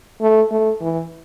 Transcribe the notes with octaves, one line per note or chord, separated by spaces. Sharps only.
A3
A3
E3